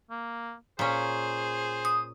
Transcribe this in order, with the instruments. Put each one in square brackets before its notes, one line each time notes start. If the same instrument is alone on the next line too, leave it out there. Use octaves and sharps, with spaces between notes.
[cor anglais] A#3
[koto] A#2 C#4 [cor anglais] G#4 [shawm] C5
[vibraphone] D#6